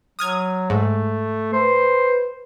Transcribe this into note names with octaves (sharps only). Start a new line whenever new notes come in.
F#3 D#6 F6 G#6
G#2 A3
B4 C5